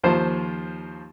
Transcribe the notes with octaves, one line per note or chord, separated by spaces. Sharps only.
D#2 F3 C5 A5